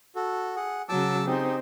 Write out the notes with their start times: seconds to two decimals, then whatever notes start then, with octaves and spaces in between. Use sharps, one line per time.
0.16 F#4 A4
0.56 G#4 F#5
0.89 C#3 F#3 A5 D6 E6
1.27 C4 D#4 G4 G#4